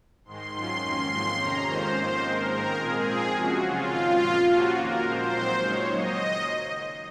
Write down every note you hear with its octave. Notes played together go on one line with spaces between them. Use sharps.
G#2 D#3 G#3 C6
G#2 D#3 F#3 C#4 F4 C6
F2 D#3 A#3 C#4 C6
G#2 F3 G#3 C4 C6
F2 C3 D#3 A#3 C#4 A#5
F2 D#3 G#3 C#4 F4 C5
G#2 F3 A#3 D#4 C5
D#3 G#3 C4 D#4 A#4
G#2 D#3 G#3 A#4
A#2 G#3 C4 F4 G#4
A#2 F3 C4 F4
C3 F3 G#3 C#4 F#4
C#3 F#3 C#4 F4
F#2 D#3 G#3 C4
A#2 F3 A#3
C3 F3 A#3 C#4 F4 F#4
F2 D#3 A#3 A#4
A#2 F3 G#3 C5
A#2 F#3 C4 D#4
C#3 G#3 D#4 C#5
D#3 F#3 A#3 D#5